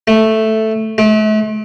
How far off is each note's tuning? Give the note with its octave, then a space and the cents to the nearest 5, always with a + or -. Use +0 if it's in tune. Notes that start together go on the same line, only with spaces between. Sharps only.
A3 +0
A3 -40